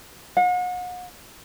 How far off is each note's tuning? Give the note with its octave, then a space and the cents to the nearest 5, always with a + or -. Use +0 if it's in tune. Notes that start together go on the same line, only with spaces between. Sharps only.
F#5 -40